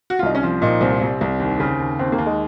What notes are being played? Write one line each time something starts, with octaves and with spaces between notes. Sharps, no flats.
F#4
F4
C2 D#4
C#4
F3 C4
A#2 D#4
C2 C4
C2
C2
D#2
C#3
D#2
D#2 C4
A#3
D#2
G#3